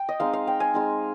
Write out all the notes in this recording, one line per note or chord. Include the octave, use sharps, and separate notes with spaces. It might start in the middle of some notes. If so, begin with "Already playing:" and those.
Already playing: G5
D#5
G#3 C4 D#4 F5
F5
G5
G#5
G#3 C4 D#4